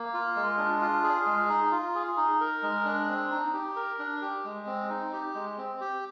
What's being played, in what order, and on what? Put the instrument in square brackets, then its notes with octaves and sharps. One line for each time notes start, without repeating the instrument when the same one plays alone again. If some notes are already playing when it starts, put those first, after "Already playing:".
Already playing: [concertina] A#3
F4
G#3
D4
F4
G#4
G#3
D#4
F4
G#4
D#4
A#4
G#3
D4
C4
D#4
G4
A#4
D4
G4
G#3
C4
D#4
G4
G#3
C4
G4